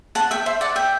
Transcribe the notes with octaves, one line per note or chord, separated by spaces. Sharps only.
F#5 A5
E5 G5
C5 E5
D5 F#5
E5 G5